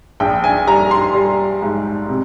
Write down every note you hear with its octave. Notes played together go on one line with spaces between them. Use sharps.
A#1 G5
G#5
G3 A#5
C6
G3
G#2
C3